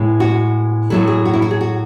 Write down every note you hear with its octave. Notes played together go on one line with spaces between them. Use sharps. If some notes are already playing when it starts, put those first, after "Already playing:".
Already playing: A2 G#3 B3 E4
F#4
A2 F#3 A3 E4 A4
G#4
F#4
E4
F#4
G#4
F#4